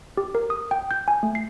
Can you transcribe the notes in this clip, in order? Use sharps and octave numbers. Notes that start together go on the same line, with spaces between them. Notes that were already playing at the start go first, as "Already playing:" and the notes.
G4
A#4
D#6
G5
G6
G#5
A3
C7